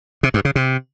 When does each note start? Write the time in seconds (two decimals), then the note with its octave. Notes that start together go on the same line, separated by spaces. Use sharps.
0.23 C3
0.34 G2
0.45 C#3
0.55 C3